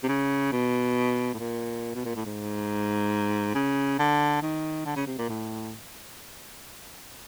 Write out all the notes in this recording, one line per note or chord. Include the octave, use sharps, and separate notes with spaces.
C3
C#3
B2
A2
A#2
B2
A#2
A2
G#2
C#3
D3
D#3
D3
C#3
C3
A#2
A2